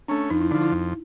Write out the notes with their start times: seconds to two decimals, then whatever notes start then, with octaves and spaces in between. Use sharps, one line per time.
0.08 A3 C#4 D4
0.30 F2 D#4
0.41 E4
0.51 D3 D#4
0.54 F3
0.62 E4
0.72 F2